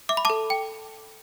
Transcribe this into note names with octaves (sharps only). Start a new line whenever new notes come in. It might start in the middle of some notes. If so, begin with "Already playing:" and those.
E5 D6
B5
A4 A5 D6
G5